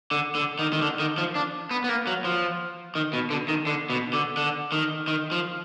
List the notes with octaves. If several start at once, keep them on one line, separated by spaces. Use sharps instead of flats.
D3
D3
D#3
D#3
D3
D#3
F3
D4
B3
B3
A#3
F#3
F3
D#3
B2
D3
D#3
D3
B2
D3
D3
D#3
D#3
F3